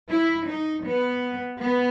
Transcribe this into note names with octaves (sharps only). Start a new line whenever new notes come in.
E4
D#4
B3
B3